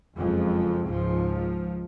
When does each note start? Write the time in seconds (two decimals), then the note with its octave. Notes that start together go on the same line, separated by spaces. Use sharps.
0.17 F#1 F2 F3 G#3
0.85 C#2 G#2 F3